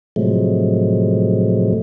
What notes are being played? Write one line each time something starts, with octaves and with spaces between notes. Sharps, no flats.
A2 C3 F3 F#3 G#3 A3